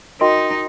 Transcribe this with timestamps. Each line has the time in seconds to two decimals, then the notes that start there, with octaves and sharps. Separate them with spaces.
0.21 D#4 F#4 A#4 D#5 G5 C6